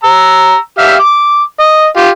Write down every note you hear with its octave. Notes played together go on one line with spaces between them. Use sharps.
A#5 E6
G4 E5 F5
D6
D#5
F4 G4